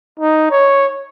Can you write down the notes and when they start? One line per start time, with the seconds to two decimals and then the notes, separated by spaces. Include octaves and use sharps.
0.20 D#4
0.51 C#5